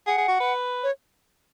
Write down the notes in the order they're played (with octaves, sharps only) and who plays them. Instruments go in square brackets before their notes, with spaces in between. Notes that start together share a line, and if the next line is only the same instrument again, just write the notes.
[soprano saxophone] G#4 [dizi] F#5
[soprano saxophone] G#4
F#4
B4
[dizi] C#5